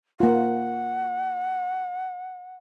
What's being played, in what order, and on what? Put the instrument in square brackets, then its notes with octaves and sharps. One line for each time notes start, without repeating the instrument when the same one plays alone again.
[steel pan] A#3 F4 [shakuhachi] F#5